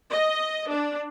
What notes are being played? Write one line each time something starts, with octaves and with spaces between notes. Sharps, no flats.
D#5
D4